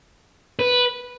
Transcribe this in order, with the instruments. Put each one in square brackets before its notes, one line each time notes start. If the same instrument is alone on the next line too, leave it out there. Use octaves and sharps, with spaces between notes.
[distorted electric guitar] B4